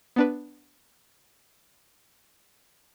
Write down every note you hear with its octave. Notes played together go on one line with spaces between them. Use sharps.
B3 D4 B4